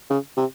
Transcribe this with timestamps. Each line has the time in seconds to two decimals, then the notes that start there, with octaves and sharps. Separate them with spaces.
0.10 C#3
0.37 C3